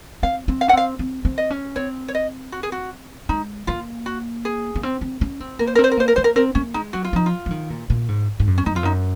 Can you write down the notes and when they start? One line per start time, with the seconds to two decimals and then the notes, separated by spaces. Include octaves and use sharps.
0.23 C4 F5
0.48 C4
0.61 F5
0.68 C#4 F#5
0.73 C4 F5
0.99 C4
1.25 C4
1.38 D#5
1.51 C#4
1.76 C4 C#5
2.08 C#5
2.15 D#5
2.52 F#4
2.63 G#4
2.72 F#4
3.29 G#3 D#4
3.67 A#3 F4
4.06 F#4
4.45 G#4
4.76 A#3
4.83 C4
5.01 C4
5.21 C#4
5.40 C4
5.59 A#3 A#4
5.67 C5
5.75 A#4
5.79 C4
5.84 C5
5.91 A#4
5.98 A#3 C5
6.08 A#4
6.16 A#3 C5
6.24 A#4
6.36 C4 A#4
6.55 A#3 C#4
6.74 G#3 D#4
6.93 F#3 F#4
7.04 F4
7.13 F3 D#4
7.26 F4
7.46 F3
7.51 D#3
7.70 A#2
7.90 A#2
8.08 G#2
8.40 G#2
8.47 F#2
8.58 C#4
8.66 F#2 D#4
8.75 F2 F4
8.83 F#2 D#4